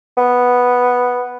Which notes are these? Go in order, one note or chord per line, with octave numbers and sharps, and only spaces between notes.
B3